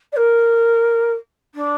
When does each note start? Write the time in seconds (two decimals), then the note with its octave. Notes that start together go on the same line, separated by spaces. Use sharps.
0.12 D5
0.16 A#4
1.55 D4